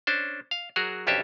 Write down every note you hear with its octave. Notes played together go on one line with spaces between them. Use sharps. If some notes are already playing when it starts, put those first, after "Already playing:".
C#4 D4 C5
F5
F#3 F#4 G#4 A#4
B1 F2 C#4 D4 G4 E5